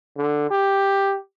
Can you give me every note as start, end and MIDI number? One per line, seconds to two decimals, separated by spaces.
0.17 0.48 50
0.51 1.16 67